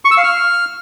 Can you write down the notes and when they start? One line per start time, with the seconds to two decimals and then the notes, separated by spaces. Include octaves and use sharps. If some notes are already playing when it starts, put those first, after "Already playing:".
0.05 C#6
0.11 E6
0.17 F5
0.24 F6